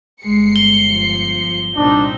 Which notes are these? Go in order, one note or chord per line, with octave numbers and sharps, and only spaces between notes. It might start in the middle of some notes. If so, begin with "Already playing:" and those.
G1 G#3 C7 C#7
G7
F3
C2 A#2 C4 D4 D#4